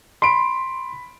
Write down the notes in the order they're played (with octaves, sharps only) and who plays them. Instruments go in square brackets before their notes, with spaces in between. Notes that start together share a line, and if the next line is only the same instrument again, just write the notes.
[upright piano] B5 D7 [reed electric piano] C6